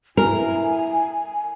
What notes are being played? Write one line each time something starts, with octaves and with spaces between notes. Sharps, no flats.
E4 A#4 G#5